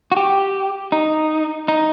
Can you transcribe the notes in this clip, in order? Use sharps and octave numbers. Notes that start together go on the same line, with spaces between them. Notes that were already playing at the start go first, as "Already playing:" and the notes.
F#4
G4
D#4
D#4